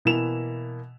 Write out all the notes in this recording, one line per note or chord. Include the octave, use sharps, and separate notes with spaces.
B2 E3 A#3 E4 E7 F7